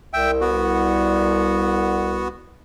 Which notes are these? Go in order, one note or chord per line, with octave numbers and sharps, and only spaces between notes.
C2 E5 G5
B3 F#4